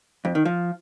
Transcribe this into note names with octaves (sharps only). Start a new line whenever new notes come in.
F2
D#3
F3